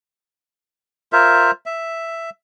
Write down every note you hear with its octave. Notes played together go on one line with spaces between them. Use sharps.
F4 A#4 C5 E5
E5